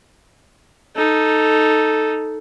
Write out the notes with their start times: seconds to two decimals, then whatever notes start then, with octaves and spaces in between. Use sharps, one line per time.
0.96 D#4 A4